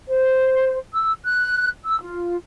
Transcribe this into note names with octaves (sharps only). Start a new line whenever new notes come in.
C5
E6
F#6
E6
F4